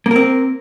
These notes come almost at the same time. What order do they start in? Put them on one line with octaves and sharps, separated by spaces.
A#3 A#4 C4